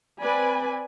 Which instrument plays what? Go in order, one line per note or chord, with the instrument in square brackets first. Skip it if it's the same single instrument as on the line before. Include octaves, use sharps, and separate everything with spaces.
[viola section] C4 B4 D5 G#5 B5